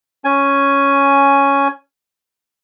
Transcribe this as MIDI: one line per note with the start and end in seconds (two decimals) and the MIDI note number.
0.25 1.68 61
0.25 1.68 80